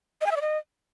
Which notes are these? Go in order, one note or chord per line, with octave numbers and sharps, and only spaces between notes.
D#5
G#5
E5
D5
D#5